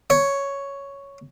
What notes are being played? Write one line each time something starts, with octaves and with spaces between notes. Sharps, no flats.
C#5